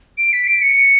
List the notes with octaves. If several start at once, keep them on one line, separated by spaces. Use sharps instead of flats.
D7
B6
D7
C#7